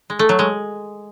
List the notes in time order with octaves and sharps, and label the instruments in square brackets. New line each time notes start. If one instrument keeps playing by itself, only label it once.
[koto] G#3
A3
F#3
G#3